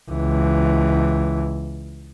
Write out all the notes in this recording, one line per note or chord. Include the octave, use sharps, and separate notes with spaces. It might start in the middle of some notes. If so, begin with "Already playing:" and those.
C#2 E3